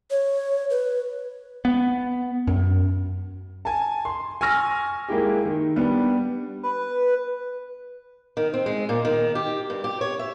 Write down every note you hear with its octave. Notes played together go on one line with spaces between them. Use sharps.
C#5
B4
B3
F#2
G#5 A5
C6
G#5 C#6 E6 F6 A#6
G#3 A#3 E4 G4
D#3
G3 B3 D4
B4
D#3
C4
G#3
A#2
D#3
G4
G2
G4
C#5
E5